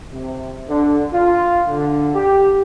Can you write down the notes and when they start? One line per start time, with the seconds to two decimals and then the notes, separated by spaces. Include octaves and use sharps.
0.13 C3
0.69 D3
1.13 F4
1.67 D3
2.15 G4